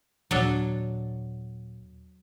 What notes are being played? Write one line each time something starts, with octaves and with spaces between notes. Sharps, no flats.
D#2 A#2 F#3 D4 A4